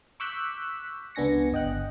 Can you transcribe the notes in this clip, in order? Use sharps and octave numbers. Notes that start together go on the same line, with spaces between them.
C#6 D6 E6 F#6 G6 B6
C#2 B3 D4 G#5 A#6 C#7
G1 D#5 G5 F#6